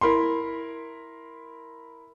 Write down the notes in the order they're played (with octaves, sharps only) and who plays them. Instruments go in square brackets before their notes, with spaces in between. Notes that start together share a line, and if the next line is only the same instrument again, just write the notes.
[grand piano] E4 A#4 B5 C6